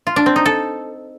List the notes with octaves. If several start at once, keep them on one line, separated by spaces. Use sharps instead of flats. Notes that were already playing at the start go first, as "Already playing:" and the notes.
F4
D4
C4
D#4
A4